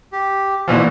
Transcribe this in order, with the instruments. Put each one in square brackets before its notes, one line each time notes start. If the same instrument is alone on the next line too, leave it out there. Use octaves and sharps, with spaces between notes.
[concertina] G4
[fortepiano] A#2 E3 F3 [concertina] F#4